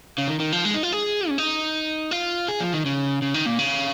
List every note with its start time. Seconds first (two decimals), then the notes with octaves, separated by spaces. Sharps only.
0.18 C#3
0.28 D#3
0.40 D#3
0.52 F3
0.65 G#3
0.74 D#4
0.83 F4
0.92 G#4
1.29 C#4
1.38 D#4
2.11 F4
2.48 G#4
2.60 F3
2.73 D#3
2.86 C#3
3.22 C#3
3.34 D#3
3.46 A#2
3.59 C#3